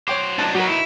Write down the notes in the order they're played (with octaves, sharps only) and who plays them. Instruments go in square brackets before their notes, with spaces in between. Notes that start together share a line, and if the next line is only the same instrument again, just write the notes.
[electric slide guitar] F#3 C5 [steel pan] C#5 G5 D6
[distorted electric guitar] D4 D#4 [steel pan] A5
[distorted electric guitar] F#3 [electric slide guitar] D#4 B4 [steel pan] F#4 A#4
[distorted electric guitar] E4